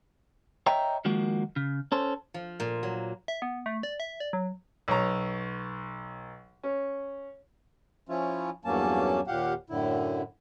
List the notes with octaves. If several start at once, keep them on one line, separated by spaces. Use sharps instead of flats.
C#5 D#5 E5 G5 A#5
D#3 F3 G#3 A#3 F#4
C#3
C#4 A4 C5
F3
A#2
F#3
E5
B3
A3
D5
E5
D5
F#3
B1 C#5 A#5
C#4
F3 C#4 E4 F4
E2 G2 F#3 A#3 C#4 A5
D#2 A#2 G4 F5 F#5
F#2 A2 D3 E4